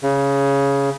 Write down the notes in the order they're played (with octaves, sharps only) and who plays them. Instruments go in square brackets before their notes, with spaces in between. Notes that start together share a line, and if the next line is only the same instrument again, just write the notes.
[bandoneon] C#3